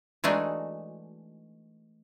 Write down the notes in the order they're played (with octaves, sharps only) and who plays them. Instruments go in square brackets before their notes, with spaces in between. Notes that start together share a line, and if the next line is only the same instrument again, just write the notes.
[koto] E3 G#3 A3 D4 D#4 F#4